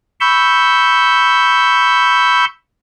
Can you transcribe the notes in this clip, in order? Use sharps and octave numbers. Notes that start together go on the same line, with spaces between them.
B5 C#6 E6 G6